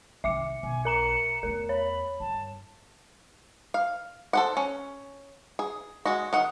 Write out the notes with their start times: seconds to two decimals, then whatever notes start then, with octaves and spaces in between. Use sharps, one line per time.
0.24 C2 D#3 E5 D6 C#7
0.63 B1 G#5
0.85 A#4 A#5 C#7 E7
1.43 E2 A3 A#4
1.69 C#5 B5
2.20 G2 A5
3.74 F5
4.33 A4 C5 F#5
4.57 C#4
5.59 G#4
6.06 G#3 F#4
6.33 D#3 F#5